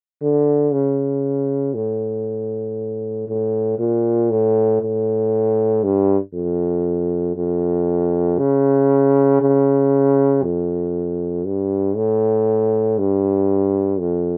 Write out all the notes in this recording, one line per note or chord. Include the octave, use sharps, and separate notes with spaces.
D3
C#3
A2
A2
A#2
A2
A2
G2
F2
F2
C#3
C#3
F2
G2
A2
G2
F2